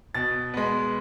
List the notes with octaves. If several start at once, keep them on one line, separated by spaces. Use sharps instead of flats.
B2 A6
G#3 B3